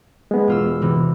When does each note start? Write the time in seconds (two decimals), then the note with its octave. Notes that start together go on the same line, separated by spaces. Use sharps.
0.31 G#3 B3
0.48 E1 F4 E6
0.82 C3 E3